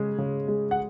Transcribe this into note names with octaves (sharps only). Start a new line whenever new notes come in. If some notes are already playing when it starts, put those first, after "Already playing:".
Already playing: C#3 G#3
C#3
G#3
F#5